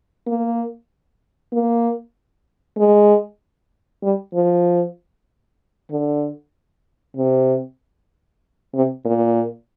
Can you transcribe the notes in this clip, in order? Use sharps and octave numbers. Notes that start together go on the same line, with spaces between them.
A#3
A#3
G#3
G3
F3
D3
C3
C3
A#2